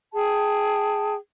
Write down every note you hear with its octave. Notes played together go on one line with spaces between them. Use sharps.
G#4 G5 A5